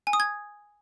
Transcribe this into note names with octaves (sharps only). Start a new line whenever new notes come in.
G#5
D#6
G#6